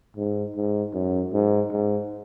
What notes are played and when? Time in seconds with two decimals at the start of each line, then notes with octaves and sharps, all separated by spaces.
0.17 G#2
0.56 G#2
0.94 F#2
1.34 G#2
1.72 G#2